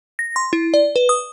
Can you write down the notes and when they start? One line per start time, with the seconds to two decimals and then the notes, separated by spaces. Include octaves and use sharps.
0.19 A#6
0.36 C6
0.53 E4
0.74 D5
0.96 B4
1.09 D#6